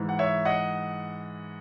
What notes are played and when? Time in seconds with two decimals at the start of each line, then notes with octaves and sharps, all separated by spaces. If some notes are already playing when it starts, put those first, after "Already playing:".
Already playing: G#2 E3
0.09 F#5
0.19 C#5 E5
0.45 D#5 F#5